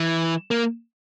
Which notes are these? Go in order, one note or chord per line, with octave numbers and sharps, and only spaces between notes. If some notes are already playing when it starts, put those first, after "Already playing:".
Already playing: E3
A#3